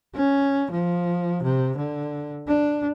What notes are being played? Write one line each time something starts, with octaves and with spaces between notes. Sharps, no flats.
C#4
F3
C3
D3
D4